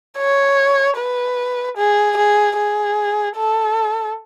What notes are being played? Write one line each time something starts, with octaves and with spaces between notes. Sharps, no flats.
C#5
B4
G#4
G#4
G#4
A4